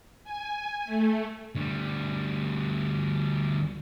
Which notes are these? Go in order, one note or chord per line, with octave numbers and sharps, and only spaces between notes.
G#5
A3
D2 G3